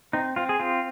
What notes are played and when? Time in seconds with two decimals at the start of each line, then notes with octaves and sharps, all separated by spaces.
0.13 C4 D#4
0.36 C4 F4
0.49 G#4
0.60 C4 F4